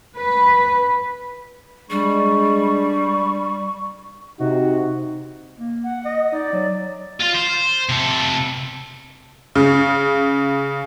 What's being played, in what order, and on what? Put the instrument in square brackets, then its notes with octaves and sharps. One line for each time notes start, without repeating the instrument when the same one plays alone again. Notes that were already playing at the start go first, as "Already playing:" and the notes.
[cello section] B4
[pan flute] G3 [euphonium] G#3 [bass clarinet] D4 [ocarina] C#6
[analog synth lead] C3 [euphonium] D#4 [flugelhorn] F#4
[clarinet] A#3
[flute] F#5
[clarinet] D#5
[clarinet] D#4 [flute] D5
[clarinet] F#3
[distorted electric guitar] F4 F5
C5
C3 A4
[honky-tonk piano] C#3